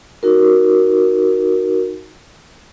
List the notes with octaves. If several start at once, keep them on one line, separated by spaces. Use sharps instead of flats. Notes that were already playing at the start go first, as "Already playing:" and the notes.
D#4 F#4 A#4